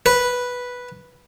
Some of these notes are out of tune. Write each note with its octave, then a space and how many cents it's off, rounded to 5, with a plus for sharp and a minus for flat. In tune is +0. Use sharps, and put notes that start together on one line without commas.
B4 -5